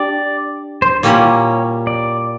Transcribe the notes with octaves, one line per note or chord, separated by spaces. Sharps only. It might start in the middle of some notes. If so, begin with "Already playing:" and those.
Already playing: D4 G4 D5
C5
A#2 G3 A#3 C#4 E4 C#5
D5